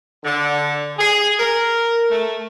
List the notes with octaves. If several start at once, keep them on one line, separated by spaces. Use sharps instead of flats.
D3
G#4
A#4
A3